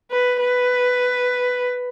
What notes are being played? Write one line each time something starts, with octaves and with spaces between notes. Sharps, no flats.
B4
B4